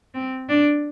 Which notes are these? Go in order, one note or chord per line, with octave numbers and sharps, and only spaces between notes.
C4
D4